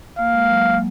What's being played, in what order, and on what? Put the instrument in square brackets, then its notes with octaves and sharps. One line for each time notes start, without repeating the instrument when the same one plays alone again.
[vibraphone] A#3 [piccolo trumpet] F5
[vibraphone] G#3
F#3